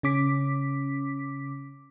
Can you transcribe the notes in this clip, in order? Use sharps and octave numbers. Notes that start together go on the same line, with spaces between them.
C#3 C#4 D6 B6